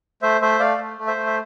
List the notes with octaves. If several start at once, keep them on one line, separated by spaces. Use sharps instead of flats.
A3 C5 E5
A3 C5 E5
A3 D5 F5
A3
A3
C5 E5
A3
E5